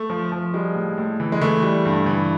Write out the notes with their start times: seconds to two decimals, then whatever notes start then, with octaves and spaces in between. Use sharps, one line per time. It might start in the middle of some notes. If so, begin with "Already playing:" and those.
Already playing: A3
0.10 F3
0.32 F3
0.54 G3 G#3
0.75 A2
0.98 A2
1.20 E3
1.32 G#3
1.41 E3 A3
1.63 G3
1.85 G2
2.06 E3